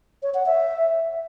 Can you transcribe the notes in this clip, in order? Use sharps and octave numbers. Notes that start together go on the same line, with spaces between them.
C#5
F#5
E5